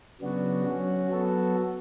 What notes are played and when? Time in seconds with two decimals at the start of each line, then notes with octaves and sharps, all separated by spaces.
0.21 C#3 F#3 B3 D4 F#4
0.65 F#3 C#4 F#4
1.11 F#3 B3 F#4 A4